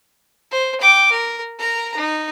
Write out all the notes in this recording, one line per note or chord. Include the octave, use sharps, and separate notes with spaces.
C5
G5 D6
A#4
A#4 A#5
D#4